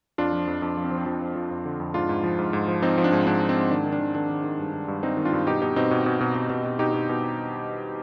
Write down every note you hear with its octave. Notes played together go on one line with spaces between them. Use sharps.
F2 D4 F4
F3
F2
F2 D4
F3
C4
F3
C4
F3 D4
F3
F3
F2
D3
F2
G#2 D4 F4
G#2
F3
G#2
G#2
F3
F3 C4 D#4
F3
D4
G#2
G#2 D4
F3
C4
G#2
D#3 D4
D#3
D4
D#3
D#3 D4
D#3
D#3
G2
D#3
G2
G2 C4 D#4
D#3
D4 F4
G2
B2 D#4 G4
B2 D#4 G4
B2 C4 D#4
B2
B2
B2
B2
B2
B2
B2 D#4 G4
B2
B2